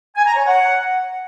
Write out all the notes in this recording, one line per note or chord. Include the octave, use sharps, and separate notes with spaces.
G#5
A#5
C#5
F#5